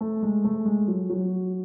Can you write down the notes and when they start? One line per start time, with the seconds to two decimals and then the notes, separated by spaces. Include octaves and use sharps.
0.01 A3
0.23 G#3
0.44 A3
0.65 G#3
0.88 F#3
1.10 F#3